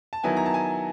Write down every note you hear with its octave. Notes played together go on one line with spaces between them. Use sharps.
A5
D#3 F#3 B3 E4 G#5
A#5
A5
G#5